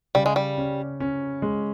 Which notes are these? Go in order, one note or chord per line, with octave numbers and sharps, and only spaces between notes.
C#3 G3
G#3
G3
C#4
C#4
G#3